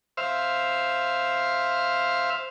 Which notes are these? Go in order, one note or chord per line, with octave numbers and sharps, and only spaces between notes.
C5 E5 F5